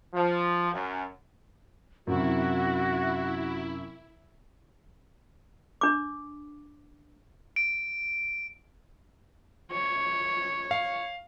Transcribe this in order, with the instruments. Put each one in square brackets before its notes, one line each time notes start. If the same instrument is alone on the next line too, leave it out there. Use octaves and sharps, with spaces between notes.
[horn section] F3
F#2
[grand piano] F#2 C3 [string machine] E4 [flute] F#4
[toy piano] D4 D6
[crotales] D7
[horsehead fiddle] C#5
[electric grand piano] F5